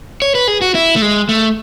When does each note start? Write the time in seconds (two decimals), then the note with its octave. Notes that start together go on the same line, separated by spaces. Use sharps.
0.22 C#5
0.35 B4
0.48 G#4
0.61 F#4
0.75 E4
0.96 A3
1.02 G#3
1.29 A3